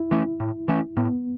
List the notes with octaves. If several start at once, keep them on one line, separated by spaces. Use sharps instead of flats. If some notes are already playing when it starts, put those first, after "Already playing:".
Already playing: E4
E3 A3 C#4
A2
E3 A3 C#4
A2 B3